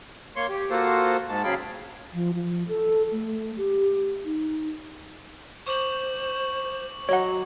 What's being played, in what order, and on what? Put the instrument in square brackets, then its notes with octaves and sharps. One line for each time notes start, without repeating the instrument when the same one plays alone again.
[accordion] A#3 C#5 C6 C#6
G4
A#3 F4 F#4 A4 C5
G#2 G#3 A5
C#3 F#3 G#4 F5 G5 B5
[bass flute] F3
F3
A4
A3
G4
D#4
[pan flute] C5 [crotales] C#6 D6 F#7
[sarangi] F#3 [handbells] C#5 F#5 [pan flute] D#5